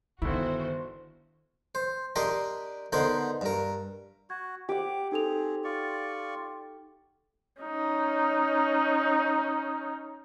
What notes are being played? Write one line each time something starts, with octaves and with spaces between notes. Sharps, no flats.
G1 D#3 E4 F#4 C5
C5
D4 G4 A#4 D#5 C6
D3 B3 D#4 A#4 C5 C6
G2 A#4
F#4 G#6
G4 F#5 D6
C4 D#4 G#4 A4 F7
F4 D5 C#6
C#4 D#4